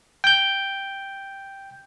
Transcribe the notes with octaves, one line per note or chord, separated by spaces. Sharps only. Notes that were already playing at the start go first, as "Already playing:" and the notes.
G5 G6